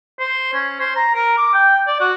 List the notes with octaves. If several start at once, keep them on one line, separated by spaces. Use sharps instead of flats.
C5
C#4
C5
A#5
A#4
D6
G5
D5
F#4